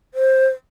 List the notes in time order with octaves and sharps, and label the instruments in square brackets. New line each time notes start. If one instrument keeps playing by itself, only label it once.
[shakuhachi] C5